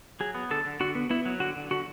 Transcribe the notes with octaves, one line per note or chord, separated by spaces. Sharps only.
F#3 G#4
B3
D3 A4
D3
D3 F#4
B3
B3 E4
F#3
D3 F#4
D3
D3 F#4